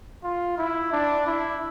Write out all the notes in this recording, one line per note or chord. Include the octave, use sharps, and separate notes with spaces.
F4
E4
D4
E4